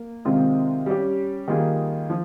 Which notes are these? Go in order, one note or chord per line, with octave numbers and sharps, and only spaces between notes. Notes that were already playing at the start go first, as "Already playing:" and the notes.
Already playing: A#3
C3 D#3 G#3 C4 F4
G3 C#4 G4
D#3 G3 A#3 F4 G#4
F3